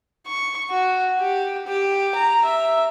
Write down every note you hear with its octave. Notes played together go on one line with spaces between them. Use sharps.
C#6
F#4
G4
G4
A#5
E5